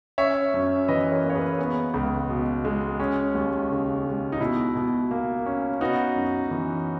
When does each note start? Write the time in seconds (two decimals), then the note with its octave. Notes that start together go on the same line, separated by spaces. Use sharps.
0.18 C#4 C#5 E5
0.54 F#2
0.88 E3 B4 D#5
1.12 A#4 C#5
1.24 A#3
1.30 C#5
1.35 G#4 B4
1.59 B3
1.94 C#2
2.29 B2
2.65 G#3
3.00 C#4
3.35 D#2
3.70 C#3
4.05 G#3
4.32 D#4
4.40 B2 E4
4.75 B2
5.11 A#3
5.46 C#4
5.81 B3 D#4 F#4
6.16 F#2
6.51 E3